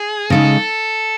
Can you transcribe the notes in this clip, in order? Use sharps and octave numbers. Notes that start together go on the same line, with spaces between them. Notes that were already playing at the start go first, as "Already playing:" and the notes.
Already playing: G#4
C#3 G#3 D#4 A4